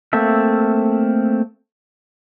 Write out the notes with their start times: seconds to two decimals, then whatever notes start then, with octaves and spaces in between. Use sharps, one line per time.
0.13 A3 A#3 C4 A4 E5